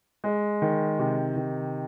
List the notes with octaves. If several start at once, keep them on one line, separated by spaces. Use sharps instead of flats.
G#3
D#3
C3
D#3